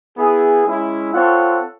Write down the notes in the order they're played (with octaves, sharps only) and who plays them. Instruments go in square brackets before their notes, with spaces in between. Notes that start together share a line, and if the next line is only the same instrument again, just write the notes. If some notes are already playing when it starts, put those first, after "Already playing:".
[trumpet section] B3 E4 G#4
G#3 C#4 E4
C4 F4 A4 C#5 F#5